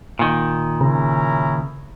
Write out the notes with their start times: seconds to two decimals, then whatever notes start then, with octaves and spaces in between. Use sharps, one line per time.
0.19 A#2 D#3
0.81 C#3 C#4 E4 A#5